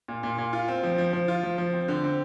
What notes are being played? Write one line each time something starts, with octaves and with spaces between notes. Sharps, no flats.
A#2
A#2
A#2
F4
C4
F3
F3
F3
F4
F3
F3
C4
D3
C4